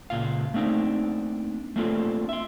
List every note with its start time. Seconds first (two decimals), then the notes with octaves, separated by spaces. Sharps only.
0.10 C#2 A#2 F4 F5
0.54 A3 A#3 C4 D4 D#4
1.76 A3 A#3 C4 D4 F4 A4
2.29 E5 C6